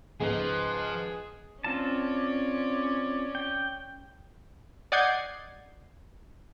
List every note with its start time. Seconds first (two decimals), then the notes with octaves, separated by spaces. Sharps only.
0.20 C#2 G#2 F3 G#4 B4
1.64 C4 C#4 F4 D5 A5
3.35 G5
4.92 D5 D#5 F#5 G6 G#6 C7